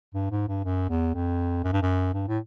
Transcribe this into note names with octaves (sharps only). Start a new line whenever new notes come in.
G2
G#2
G2
F#2
E2
F2
F#2
G2
F#2
G2
A2